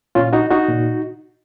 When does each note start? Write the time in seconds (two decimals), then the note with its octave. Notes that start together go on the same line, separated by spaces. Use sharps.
0.15 A#2 C#4 F4
0.33 D#4 F#4
0.50 D#4 F#4
0.68 A#2